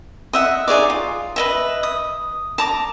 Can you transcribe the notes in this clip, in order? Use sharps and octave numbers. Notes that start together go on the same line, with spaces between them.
D#5 E5 F#5
D#4 G#4 C#5 D5
F4
B4 D#5 E5
D#6
A5 A#5 D6